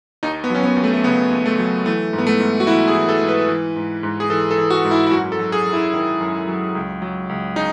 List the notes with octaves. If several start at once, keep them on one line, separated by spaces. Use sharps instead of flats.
D#2 D#4
B3
F#3 C#4
B3
D#2
A3
A3
C#3 B3
D#2
A3
F#3
E3 A3
G#2
B3
A3
G#2
F#4
E3 E4
G#4
E3
A4
G#2
B4
E3
G#2
G#2
G#4
E3 A4
A4
E3
F#4
G#2
E4
E4
F#2 F#4
A4
F#3
G#4
F#2
E4
D#3
F#2
F#3
C#2
F#3
C#2
C#3 D#4